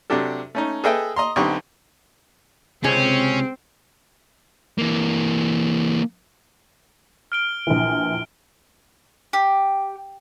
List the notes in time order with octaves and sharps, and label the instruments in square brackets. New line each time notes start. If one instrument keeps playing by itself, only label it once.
[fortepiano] C3 F#3 D4 G4 A4
A3 C#4 D#4
G#4 A4 B4 D#5 E5 G5
D#5 A#5 C6
B1 D3 C4 D#4 G4 C#6
[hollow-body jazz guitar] C#2 C3 G#4 [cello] C4 [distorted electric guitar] C#4
[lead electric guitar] E3 A#3
[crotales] F6 D7 G7
[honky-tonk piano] A#1 E3
[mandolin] G4